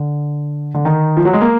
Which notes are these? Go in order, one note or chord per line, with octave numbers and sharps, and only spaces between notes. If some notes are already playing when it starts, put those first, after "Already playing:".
Already playing: D3
D3
D#3
F3
F#3
G#3
A#3